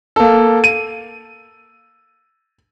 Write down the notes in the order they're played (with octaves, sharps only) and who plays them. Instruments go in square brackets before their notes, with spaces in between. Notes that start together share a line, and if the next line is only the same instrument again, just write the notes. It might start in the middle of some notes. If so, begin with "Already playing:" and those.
[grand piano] A#3 A4
D#7